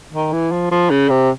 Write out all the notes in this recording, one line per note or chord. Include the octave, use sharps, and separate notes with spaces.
D#3
E3
F3
F3
C#3
C3